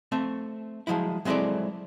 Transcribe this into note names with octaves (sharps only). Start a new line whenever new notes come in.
A3 C4 E5
F3 F#3 G#3 E4
F#3 G#3 C4 E4 A4 D5